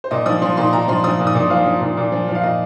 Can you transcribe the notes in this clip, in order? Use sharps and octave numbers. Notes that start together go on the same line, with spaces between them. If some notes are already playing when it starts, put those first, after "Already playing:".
C5
A#2 D#5
F3 D#6
F3 C6
A#2 C6
A#2 A#5
F3 C6
F3 D#6
A#2
D#6
A#2
F3 F5
F3
A#2
A#2
F3
F3
F5
A#2 D#5